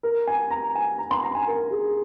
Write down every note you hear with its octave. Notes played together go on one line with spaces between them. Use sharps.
A#4
G#5
A#5
G#5
A#5
C6
A#5
G#5
A#4
G#4